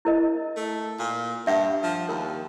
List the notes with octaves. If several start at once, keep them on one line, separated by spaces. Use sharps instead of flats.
E4 A#4 D#5
A3
A#2
G2 E5 F#5
F3
D#2 A#4